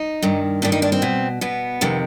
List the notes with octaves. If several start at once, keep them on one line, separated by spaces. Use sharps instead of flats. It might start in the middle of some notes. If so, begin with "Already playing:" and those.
Already playing: D#4
G2 D#3
G2 D#3 D4
D#4
D4
C4
B2
B2 B3
F2 C3 D#3